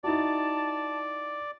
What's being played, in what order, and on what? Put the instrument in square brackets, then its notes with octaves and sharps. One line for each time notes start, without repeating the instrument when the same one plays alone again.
[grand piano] D#4 E4 F#4 [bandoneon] D5 [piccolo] A5